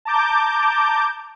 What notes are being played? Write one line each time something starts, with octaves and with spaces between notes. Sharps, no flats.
A5 A#5 D6 G6